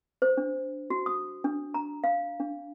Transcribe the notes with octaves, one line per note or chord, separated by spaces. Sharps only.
C5
D4
F#4
D#6
D4
A#5
F5
D4